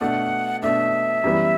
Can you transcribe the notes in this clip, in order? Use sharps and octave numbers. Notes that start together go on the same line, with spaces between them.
B2 A3 D4 F#5
B2 A3 D4 E5
F#2 E3 G3 B3 E4